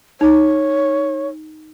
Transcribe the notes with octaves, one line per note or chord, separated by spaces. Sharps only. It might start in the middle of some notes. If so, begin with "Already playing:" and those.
D#4 C#5